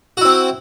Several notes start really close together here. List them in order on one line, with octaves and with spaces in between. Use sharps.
F#4 E4 C4